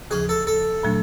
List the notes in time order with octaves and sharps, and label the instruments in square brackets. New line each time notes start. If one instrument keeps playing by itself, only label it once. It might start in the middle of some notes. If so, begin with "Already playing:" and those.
[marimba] D#2 C#3 F3 [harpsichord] G#4
[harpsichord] A4
A4
[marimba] A#2 F#3 A3 D4